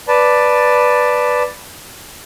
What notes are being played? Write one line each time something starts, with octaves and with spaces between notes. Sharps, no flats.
B4 D5 A5